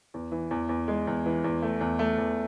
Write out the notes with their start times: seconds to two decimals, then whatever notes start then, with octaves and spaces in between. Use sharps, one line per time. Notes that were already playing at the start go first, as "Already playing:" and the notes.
0.14 E2
0.32 E3
0.51 E2
0.69 E2
0.88 G#3
1.07 E2
1.26 E3
1.44 E2
1.62 A3
1.80 E2
1.99 A3
2.18 E2